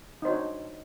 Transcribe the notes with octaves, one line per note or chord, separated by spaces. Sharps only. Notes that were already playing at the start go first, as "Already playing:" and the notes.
D4 D#4 F#4 C5 C#5